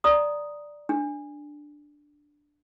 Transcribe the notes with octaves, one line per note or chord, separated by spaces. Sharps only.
D5 A#5 D#6
D4